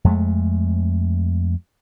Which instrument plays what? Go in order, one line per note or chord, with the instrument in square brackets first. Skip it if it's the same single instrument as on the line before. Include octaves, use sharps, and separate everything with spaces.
[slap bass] F2 G#3 A3